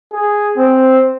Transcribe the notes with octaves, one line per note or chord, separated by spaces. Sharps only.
G#4
C4